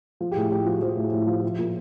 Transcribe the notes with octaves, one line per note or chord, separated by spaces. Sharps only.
F3
G4
A2 G#4
A2 G4
F3 F#4
F3 C5
A2
A2
F3
F3
A#2